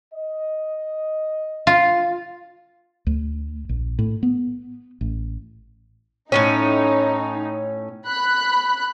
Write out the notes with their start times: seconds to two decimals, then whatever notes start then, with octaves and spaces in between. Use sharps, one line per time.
0.14 D#5
1.67 F4
3.07 D2
3.69 A#1
3.99 A2
4.23 B3
5.01 A1
6.32 A2 C#3 C#4 D#4
8.07 B5 F#6